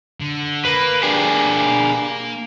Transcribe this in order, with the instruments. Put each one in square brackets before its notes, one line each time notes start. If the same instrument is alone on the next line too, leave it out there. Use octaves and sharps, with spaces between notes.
[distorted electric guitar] D3
[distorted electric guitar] A#3 [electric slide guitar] B4
[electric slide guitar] D4 G4 G#4